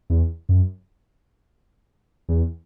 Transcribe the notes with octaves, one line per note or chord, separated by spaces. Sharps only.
E2
F#2
E2